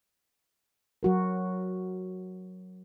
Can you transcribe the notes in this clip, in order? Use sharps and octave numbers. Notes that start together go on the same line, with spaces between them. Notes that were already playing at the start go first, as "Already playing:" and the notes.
F#3 F#4 A#4